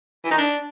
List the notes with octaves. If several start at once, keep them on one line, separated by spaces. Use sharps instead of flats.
E3
D#4
D4